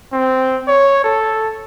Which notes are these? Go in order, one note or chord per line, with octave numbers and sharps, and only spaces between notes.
C4
C#5
A4